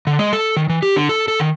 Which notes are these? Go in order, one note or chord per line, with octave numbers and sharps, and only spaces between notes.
D3
G#3
A4
D#3
E3
G4
D3
A4
A4
D#3